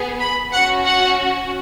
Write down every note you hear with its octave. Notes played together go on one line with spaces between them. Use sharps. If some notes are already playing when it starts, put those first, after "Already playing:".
Already playing: B3 G#4
B5
C#4 F#4 F#5
F#5